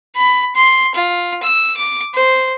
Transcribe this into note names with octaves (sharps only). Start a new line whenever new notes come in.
B5
C6
F4
E6
D6
C5